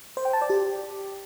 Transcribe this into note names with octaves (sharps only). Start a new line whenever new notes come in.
C5
G5
A5
D5
G4